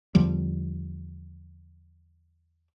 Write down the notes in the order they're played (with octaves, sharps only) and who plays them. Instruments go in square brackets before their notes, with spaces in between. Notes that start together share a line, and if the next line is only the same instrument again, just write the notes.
[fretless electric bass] E2 D3 F3 G3